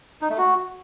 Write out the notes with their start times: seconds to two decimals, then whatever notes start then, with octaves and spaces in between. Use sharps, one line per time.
0.22 D#4
0.30 A3
0.38 F#4